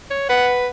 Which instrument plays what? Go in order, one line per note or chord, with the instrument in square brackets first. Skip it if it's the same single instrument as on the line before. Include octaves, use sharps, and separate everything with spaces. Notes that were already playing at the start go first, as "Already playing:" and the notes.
[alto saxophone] C#5
[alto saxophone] B4 [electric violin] F#5